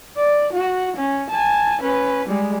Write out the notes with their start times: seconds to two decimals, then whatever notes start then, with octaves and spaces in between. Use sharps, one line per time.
0.17 D5
0.53 F#4
0.96 C#4
1.30 G#5 A5
1.81 C#4 B4
2.28 G3 G#3